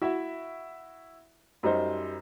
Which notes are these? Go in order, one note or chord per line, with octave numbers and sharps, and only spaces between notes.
E4 F#4 E5
F#2 G3 D#4 C5